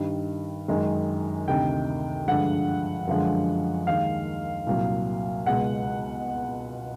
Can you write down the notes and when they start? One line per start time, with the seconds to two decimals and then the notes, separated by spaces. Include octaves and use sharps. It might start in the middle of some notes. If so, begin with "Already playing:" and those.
Already playing: G2 D#3 G3
0.68 F#2 D#3 G#3
1.48 D2 C3 D#3 G5
2.28 G2 D3 F3 G#3 F#5
3.07 F#2 D3 F3 G#3
3.87 D#2 D#3 G#3 F5
4.67 C2 A#2 F#3
5.46 C#2 B2 G#3 F#5